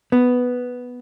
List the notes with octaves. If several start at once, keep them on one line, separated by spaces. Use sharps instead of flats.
B3